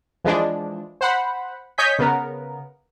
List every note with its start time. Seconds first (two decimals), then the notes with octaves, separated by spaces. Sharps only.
0.24 E3 F3 G#3 D4
1.01 C5 F#5 B5
1.78 C#5 D#5 G#5 G6 B6
1.99 C#3 B3 A#4